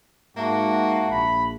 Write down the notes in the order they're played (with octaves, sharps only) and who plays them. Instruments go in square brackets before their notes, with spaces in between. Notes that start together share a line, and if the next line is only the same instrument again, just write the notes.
[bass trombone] G#2 [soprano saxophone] A#3 [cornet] F#4 [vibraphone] E5 A5
[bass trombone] A#1 [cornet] B5